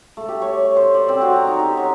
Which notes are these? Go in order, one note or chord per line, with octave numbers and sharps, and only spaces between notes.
A3
G4
C#5
C#5
C5
D5
C4
F#4
A#5
D#4
G4
C#5